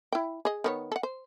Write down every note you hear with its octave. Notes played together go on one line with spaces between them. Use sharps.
E4 G5
G#4 D#5
D#3 B3 C#5
A4 F#5
C5